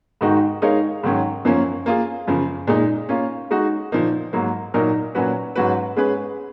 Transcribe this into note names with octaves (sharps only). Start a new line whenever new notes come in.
G#2 D#3 G#3 D#4 F#4
G#3 D#4 A#4 C#5 F5
G#2 D#3 F#3 C#4
F#2 F3 A#3 C#4
A#3 F4 G#4
F#2 C#3 F3
A#2 G#3 D#4
A#3 C#4 F4
G#3 D#4 F#4
A#2 F3 A#3 D#4
G#2 F#3 A#3
A#2 F#3 A#3 D#4 A#4
A#2 F#3 C#4 F#4 B4
G#2 F#3 C#4 F#4 B4
G#3 C#4 G#4 B4